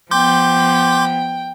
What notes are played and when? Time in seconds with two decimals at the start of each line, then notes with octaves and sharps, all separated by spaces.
0.11 F3 B3 G5 C6 D6 G6